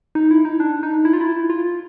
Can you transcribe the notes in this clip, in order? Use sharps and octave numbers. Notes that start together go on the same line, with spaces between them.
D#4
E4
D#4
D4
D#4
E4
F4
E4
F4